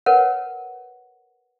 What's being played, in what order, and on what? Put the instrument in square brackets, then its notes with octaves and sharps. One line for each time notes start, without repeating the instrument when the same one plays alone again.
[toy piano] A#4 B4 C#5 F#5